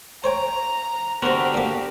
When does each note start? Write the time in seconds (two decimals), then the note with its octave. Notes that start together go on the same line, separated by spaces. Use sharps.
0.24 C5 C#5 G5 A#5
1.22 D3 B3 F#4 G4 A#4 C5
1.54 A#2 A#3